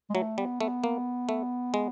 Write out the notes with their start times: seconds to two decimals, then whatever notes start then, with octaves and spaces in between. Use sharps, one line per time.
0.10 G#3
0.14 F#3 A3
0.38 G3 B3
0.61 A3 B3
0.84 A#3
1.29 A3
1.74 G#3